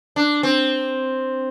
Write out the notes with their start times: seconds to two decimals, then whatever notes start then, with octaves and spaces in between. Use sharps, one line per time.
0.16 D4
0.43 C4